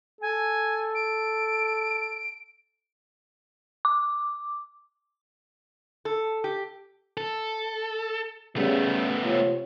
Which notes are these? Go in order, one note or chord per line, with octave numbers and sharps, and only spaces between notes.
A4 G#5
D7
D6
A4
G4
A4
C#3 G3 A3 B3
C3 F4 C#5